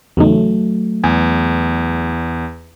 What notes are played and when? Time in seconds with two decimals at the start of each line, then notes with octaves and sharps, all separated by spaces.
0.17 E2 C#3 F#3 A3 D#4
1.04 E2 G#5